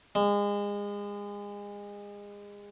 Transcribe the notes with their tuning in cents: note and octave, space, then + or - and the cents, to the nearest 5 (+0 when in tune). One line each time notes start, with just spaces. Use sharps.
G#3 -30